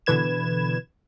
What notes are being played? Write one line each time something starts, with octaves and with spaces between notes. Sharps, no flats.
B2 D3 E3 B4 G#6 E7